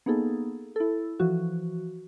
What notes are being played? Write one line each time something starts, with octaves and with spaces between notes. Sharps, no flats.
A#3 B3 D#4 G#4 A4
E4 A4
E3 F3 F#4